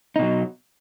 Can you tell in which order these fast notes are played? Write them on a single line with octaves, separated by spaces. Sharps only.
D#4 B2 F#3